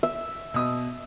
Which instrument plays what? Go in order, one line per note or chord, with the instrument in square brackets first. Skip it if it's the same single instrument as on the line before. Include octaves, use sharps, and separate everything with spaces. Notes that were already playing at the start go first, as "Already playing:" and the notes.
[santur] E5
[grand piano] B2 D#6